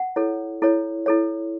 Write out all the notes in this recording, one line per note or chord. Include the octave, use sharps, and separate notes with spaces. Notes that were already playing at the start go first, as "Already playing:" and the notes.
Already playing: F#5
E4 A4 C#5
E4 A4 C#5
E4 A4 C#5